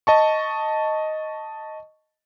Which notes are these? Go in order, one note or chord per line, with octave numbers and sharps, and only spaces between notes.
D#5 A5 C#6